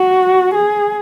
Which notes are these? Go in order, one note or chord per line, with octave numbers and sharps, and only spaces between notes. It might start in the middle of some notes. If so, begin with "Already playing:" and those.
Already playing: F#4
G#4